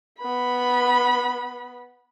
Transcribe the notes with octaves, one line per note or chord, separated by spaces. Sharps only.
B3 B5